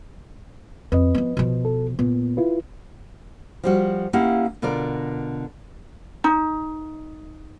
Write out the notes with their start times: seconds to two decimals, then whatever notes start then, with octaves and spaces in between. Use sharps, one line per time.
0.92 F2 B4 D#5
1.14 F3 B3
1.37 B2 F3
1.65 A4
1.99 A#2 B3
2.37 E4 F4 B4
3.64 F3 G3 F#4
4.13 A#3 C#4 E4 G4 F5 F#5
4.62 B2 D3 F4 A#4 D5
6.24 D#4